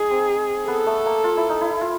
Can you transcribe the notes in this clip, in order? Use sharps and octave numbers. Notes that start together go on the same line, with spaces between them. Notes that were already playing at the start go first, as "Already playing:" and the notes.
Already playing: D#4 G#4
C4
B3 A4
A3
A#3
F4
E4
D#4
E4
F4